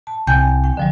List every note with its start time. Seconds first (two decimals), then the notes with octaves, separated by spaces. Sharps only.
0.07 A5
0.27 C2 G5 G#5 G6
0.64 G5
0.77 D3 F3 G3